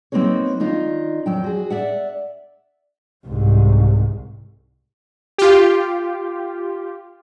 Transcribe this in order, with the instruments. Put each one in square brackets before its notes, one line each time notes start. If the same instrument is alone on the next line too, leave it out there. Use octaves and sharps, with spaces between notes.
[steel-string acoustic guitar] F#3 A#3 C4 D#4 B4 C#5
D#3 D4 D#4 F4
F2 F#3 G5
F#4 G#4
D5 E5 F#5
[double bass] C2 G#2
[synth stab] F4 G4